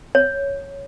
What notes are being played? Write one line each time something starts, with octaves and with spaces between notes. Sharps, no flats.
C#5